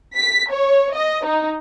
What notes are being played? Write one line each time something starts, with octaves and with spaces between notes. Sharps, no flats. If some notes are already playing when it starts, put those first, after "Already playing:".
B6
C#5
D#5
D#4